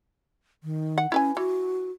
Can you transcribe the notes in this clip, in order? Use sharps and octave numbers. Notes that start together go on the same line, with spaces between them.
D#3
F#5
C#4 E4 B4 G#5
E3 F#4